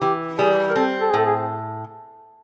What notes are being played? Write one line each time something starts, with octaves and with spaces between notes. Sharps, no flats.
E3 G4
G3 G#4
A#4
C4 A4
A4
G#4
A2 A4
G#4